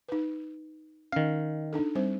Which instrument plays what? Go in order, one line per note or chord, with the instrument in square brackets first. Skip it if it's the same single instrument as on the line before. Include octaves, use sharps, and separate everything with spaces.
[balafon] D#4 B4
[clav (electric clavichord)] D#3 F5 [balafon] C#4
[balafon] D4 D#4 A4
G3 C4 C5